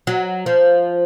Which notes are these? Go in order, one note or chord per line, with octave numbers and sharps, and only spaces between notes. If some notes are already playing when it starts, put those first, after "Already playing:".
F#3
F3